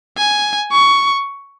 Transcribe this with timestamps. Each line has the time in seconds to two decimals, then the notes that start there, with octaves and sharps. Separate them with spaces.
0.17 G#5
0.71 C#6